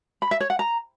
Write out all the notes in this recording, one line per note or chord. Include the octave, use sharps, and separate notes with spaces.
B5
E5
C#5
F#5
A#5